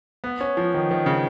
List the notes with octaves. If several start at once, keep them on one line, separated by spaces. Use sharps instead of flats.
B3
C#4
F3
D#3
D#3
C#3